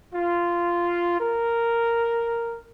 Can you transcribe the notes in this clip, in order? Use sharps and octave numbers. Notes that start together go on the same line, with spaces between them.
F4
A#4